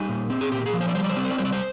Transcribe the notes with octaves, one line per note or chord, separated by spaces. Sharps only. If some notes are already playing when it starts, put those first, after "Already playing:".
Already playing: G3 D#4
A#2
C4
G#4
A#2 G4
G#4
F3
C5
D5
G3 C5
D5
C5
C4 D5
C5
D5
G3 C5
D5
C5